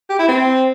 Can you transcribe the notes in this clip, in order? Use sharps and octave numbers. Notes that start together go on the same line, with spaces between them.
G4
E4
C4